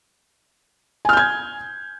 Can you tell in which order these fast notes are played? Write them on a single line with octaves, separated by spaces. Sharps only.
G#5 F6 G6 G#6